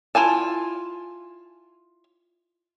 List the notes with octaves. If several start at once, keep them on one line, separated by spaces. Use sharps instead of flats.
E4 F4 G#5 A5